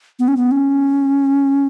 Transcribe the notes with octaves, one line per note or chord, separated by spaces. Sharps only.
B3
C#4
B3
C#4